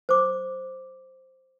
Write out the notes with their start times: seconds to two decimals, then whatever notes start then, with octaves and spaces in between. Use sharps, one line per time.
0.09 C5 D6